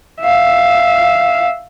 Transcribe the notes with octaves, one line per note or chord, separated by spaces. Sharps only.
E5 F5